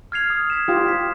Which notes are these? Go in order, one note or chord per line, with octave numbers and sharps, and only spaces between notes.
F6 G#6 C7 F7
D#6
G#6 B6 E7
F4 G4 D#6
G#6 B6 E7